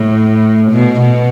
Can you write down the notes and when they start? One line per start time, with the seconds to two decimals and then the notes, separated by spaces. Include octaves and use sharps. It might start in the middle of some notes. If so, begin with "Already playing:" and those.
Already playing: A2
0.71 B2
1.00 B2